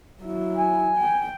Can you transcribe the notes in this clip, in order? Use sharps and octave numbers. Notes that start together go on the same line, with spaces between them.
F#3 E4
G#5
G5